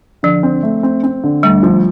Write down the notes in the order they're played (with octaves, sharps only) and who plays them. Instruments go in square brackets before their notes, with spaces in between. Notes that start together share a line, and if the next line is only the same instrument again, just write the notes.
[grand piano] D3 [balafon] F3
[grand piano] C4
A3
C4
C4
D3
[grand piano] D2 [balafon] G3
[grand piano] F3